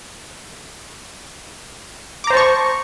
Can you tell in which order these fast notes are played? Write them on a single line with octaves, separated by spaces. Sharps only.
D6 A#5 C5 A5 C#6